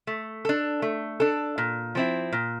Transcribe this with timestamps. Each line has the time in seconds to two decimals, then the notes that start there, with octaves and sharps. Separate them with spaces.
0.07 A3
0.45 D4 A4
0.82 A3
1.20 D4 A4
1.58 A#2
1.95 F3 C4 E4
2.33 A#2